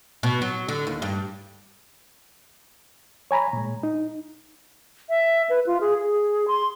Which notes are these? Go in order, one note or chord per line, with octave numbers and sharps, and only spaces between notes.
B2
F#3
D3
D#2
G2
C#5 G#5 A#5 B5
A#2 G#3
D#4
E5
B4
F4
G#4
G#4
C6